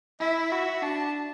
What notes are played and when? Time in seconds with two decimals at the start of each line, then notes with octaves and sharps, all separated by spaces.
0.20 E4 E5
0.52 F#4 E5
0.82 D4 A5